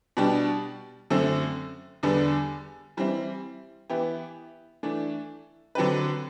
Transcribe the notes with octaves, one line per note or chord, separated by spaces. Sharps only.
B2 G3 D4 G4
F#2 D3 A3 C4
E2 D3 G3 B3 D4
E3 G3 C4 E4
E3 B3 E4 G4
E3 A3 D4
D3 F#3 C4 G4 B4